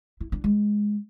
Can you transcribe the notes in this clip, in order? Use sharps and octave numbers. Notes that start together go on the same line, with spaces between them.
E4
D4
G#3